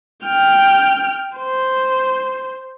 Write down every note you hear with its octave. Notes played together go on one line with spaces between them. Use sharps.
G5 F6
C5